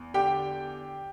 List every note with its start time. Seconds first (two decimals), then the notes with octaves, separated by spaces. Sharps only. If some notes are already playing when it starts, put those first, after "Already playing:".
Already playing: E2
0.14 D3 G4 G5